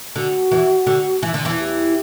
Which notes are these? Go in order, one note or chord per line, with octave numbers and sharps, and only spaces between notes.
D3 F#4
E2 E3
D3
E3
D3
E2 E3
G4